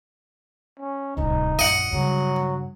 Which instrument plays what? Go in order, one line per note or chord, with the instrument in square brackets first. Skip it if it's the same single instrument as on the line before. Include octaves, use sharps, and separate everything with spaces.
[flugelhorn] C#4
[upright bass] D1 C2 [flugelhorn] D#4
[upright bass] A#1 F#2 [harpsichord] D#5 F#5
[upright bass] G2 C#3 [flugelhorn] F#3